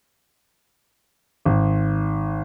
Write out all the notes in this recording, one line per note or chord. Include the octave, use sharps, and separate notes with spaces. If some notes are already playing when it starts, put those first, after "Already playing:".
G#1